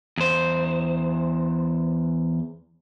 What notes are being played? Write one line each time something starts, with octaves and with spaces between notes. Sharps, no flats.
E2 C5